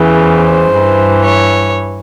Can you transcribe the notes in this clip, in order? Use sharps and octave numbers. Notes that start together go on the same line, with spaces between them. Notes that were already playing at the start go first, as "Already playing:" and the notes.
Already playing: E2 C#3 E3
C5
G2 E3
C#5